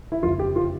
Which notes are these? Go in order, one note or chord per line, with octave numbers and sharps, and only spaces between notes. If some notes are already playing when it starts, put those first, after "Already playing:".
E4
F#1 F2 D3 F3 F4
G4
F4